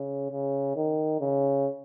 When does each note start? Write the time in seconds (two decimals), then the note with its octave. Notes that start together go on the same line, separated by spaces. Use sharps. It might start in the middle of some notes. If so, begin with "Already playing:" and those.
Already playing: C#3
0.31 C#3
0.75 D#3
1.20 C#3